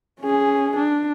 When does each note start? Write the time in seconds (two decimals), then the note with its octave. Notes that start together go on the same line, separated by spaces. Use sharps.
0.20 C#4 G#4
0.76 D4